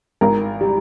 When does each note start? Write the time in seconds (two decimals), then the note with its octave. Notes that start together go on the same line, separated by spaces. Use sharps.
0.21 G#1 A#4
0.61 G3